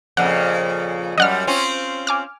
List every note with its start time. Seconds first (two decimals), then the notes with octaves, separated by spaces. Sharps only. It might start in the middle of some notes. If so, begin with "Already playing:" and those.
0.17 F2 A#2 C#3 F#5
1.18 F#2 G3 D#5 F#5 F6
1.47 C4 C#4 F4
2.07 G#5 D6 F6